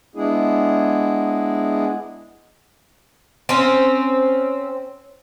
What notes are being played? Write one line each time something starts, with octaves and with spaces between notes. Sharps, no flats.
G#3 B3 D4 E4 G#4
C4 C#4